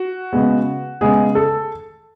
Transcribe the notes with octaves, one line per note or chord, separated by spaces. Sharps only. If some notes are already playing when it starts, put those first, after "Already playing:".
Already playing: F#4
C#3 G#3 B3
C#3 G#3 B3 G#4
A4